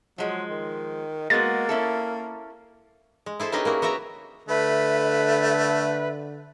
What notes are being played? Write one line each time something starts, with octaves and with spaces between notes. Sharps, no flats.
F3 F#3 G#3
D#3
G#3 A#3 B3 F#4 A6
C#4 E4 A4
G#3
E4 G#4 A4 C5
B3 C#4 D#4 G4 G#4 D#5
A#3 E4 F#4
B3 F#4 E5 G5 A#5
D3 A3 B4 E5